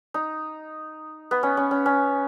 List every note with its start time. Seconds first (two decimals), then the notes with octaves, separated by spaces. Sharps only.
0.14 D#4
1.31 B3
1.43 C#4
1.57 C#4
1.71 C#4
1.86 C#4